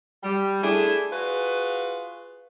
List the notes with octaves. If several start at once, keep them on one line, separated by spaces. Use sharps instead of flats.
G3
A3 D4 E4 G#4
F4 F#4 G#4 B4